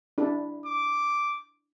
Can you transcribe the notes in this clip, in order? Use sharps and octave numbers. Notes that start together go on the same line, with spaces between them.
D4 E4 A4
D6